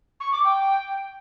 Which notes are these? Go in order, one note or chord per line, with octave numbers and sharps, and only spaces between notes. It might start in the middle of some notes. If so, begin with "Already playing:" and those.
C#6
D6
G5